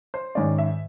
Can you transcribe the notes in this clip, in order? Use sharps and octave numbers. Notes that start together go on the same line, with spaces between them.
C5
G#2 D#3 G#3 C#4 D5
E5